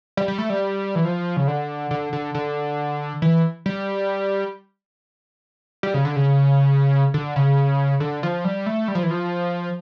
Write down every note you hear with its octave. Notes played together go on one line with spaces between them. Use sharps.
G3
G3
A3
G3
E3
F3
C#3
D3
D3
D3
D3
E3
G3
G3
C#3
D3
C#3
D3
C#3
D3
F3
G3
A3
G3
F3
E3
F3